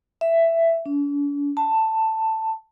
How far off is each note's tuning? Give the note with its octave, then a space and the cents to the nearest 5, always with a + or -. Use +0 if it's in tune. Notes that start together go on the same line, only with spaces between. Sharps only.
E5 +10
D4 -45
A5 +10